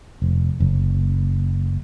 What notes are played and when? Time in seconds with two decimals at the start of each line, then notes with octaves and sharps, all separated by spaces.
0.22 F1
0.60 F#1